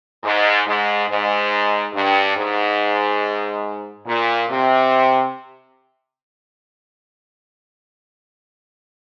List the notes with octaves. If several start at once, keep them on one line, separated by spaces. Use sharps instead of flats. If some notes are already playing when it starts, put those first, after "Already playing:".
G#2
G#2
G#2
G2
G#2
A#2
C3